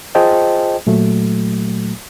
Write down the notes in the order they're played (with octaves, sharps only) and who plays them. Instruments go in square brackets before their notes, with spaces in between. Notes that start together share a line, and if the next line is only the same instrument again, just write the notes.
[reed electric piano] F4 G#4 C5 D#5 G5 A5
A#2 F#3 A3